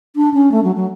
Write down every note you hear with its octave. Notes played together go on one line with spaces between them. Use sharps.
D4
C#4
A3
F#3
F#3